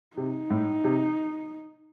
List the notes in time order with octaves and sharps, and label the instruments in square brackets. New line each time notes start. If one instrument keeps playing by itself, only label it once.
[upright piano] C3 [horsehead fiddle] D#4
[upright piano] A2
C3